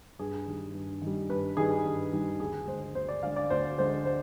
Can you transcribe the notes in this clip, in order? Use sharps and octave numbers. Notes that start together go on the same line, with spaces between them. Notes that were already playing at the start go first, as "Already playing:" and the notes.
G2 G#4
D#3 G3
G2
D#3 G3
G2 B4
D#3 G3 G#4
G2
D#3 G3
D2 G#4
D3 G#3 C5
D2 C5
D5
D3 G#3 F5
D5
D2 C5
D3 G#3 C5
C5